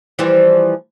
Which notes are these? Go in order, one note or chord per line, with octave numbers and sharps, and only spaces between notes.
E3 F3 G3